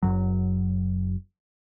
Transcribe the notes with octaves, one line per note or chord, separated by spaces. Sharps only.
F#1 C2 F#2 F#3